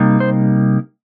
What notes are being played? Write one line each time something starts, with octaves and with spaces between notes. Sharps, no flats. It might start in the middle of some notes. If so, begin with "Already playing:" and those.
Already playing: C3 G3 A#3 D#4
C5